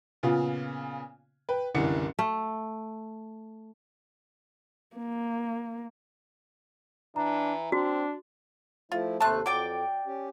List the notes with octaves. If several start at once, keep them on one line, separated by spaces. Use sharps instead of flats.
A#2 C#3 B3 F4
B4 G5
F#1 C2 D3 E3 C#7
A3
A#3
E3 D4 A#5
C4 D4 F#4
F3 A3 E4 F4
D#2 C3 A3 A4 A5 C6 F#6
F2 F#3 D5 G5 D6
C#4 G4